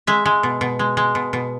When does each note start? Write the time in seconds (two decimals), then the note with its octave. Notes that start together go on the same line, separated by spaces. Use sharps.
0.07 G#3 E5
0.26 G#3
0.43 B2
0.61 B2
0.79 G#3
0.97 G#3
1.15 B2
1.33 B2